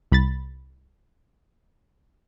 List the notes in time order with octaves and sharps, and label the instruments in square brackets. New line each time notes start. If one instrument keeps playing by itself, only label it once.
[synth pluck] C2 B5 A6